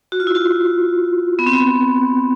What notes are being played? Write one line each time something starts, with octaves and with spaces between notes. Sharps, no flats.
F#4
F4
E4
F4
B3
C4
B3